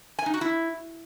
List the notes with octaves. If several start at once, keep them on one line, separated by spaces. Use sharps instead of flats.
G#5
D#4
F#4
E4